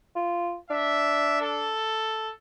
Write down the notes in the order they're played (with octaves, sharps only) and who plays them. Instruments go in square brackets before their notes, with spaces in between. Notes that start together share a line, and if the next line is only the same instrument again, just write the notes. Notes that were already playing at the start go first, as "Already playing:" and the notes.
[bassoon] F4
[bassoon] D4 [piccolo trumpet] E5
[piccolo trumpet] A4